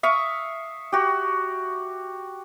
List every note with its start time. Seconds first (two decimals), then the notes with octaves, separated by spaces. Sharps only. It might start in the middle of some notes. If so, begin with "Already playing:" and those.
0.03 E5 F5 C#6 D#6
0.92 F#4 G4